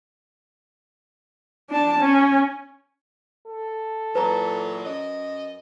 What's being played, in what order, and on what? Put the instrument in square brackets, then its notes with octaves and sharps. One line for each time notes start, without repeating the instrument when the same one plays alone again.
[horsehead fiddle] D4 A5
C#4
[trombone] A4
[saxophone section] A#2 E3 F#3 [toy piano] B4 A#5
[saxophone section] F#2 D#5